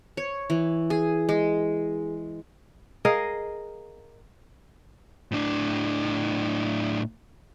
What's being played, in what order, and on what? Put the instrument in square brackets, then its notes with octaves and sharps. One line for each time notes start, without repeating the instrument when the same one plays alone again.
[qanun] C#5
E3
G#4
G#3
[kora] G#4 A#4 D#5 F5
[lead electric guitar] A2 D4